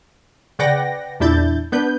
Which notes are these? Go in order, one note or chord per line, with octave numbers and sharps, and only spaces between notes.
C#3 B4 D5 F#5 G5 A#6
E2 A#2 D4 E4 G6 A6
B3 D4 B4 G6